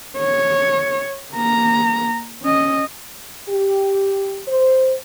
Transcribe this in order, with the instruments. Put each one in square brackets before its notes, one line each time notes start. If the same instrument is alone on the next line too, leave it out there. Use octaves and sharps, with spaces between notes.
[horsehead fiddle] C#5
A#3 A#5
C#4 D#5
[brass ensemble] G4
C5